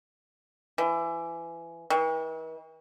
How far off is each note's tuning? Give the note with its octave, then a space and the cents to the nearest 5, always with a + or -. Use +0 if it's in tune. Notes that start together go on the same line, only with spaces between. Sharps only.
E3 +25
E3 -45